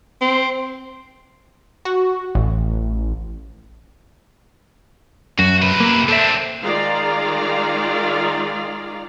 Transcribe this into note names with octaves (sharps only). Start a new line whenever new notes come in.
C4
F#4
A1
F#2 F#4
C3 B4
A#3
C4 D4 A4 E5
D#3 G#3 F4 D5 F5 A#5